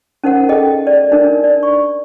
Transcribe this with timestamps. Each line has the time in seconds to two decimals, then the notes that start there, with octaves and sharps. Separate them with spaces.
0.24 C#4 D#4 A#4 C5 F#5
0.49 G#4 A4 D#5 G5
0.87 D5
1.12 D4 D#4 A#4
1.44 D5
1.63 C#6